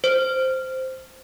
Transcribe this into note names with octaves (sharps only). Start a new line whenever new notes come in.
C5